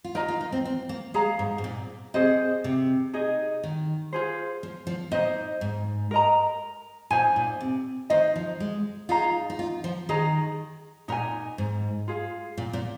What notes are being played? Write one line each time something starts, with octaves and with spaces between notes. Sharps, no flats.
F4
D#4 A#4 D#5 A#5
F4
D#4
C4
C4
A#3
G#3 G#4 F5 A#5
G#2
G#2
A#2
C3 G#4 C5 D#5
C3
D#4 G#4 D#5
D#3
F4 G#4 C5
F3
F3
A#2 D#4 C5 D#5
G#2
A#4 D#5 A#5
A#2 D#4 C5 G#5
A#2
C3
D#3 D#4 C5 D#5
F3
G#3
D#4 F4 G#4 F5 A#5
D#4
F4
F3
D#3 G#4 D#5 A#5
A#2 D#4 A#4 G#5
G#2
F4 G#4 F5
A#2
A#2